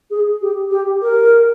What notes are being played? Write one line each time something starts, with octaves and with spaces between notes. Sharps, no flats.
G#4
G4
G4
A#4